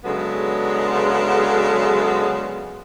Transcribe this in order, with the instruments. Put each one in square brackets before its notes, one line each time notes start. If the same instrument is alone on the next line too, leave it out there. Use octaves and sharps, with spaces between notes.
[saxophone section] C#3 F#3 G#3 B3 D4 A4